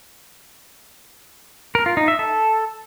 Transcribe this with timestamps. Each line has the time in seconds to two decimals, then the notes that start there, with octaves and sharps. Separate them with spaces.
1.75 A#4
1.86 F4
1.97 D#4
2.08 E5
2.19 A4